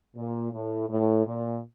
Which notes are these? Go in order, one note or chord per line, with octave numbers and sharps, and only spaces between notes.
A#2
A2
A2
A#2